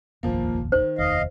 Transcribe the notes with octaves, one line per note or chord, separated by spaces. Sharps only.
F1 A#1 D#2 A#2 F3 A#3
D#3 C5
F1 D#2 D#5 F5